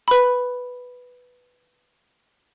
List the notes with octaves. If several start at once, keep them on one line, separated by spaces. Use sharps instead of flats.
B4 B5